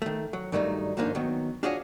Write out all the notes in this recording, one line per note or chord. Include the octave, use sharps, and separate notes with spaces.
D#3 A3
F#3
G2 D#3 F#3 G3 A3 D#4
D#2 G#2 F3 A#3 D4 D#4
D#3 F#3 B3
D4 F4 F#4 G#4 C#5 D#5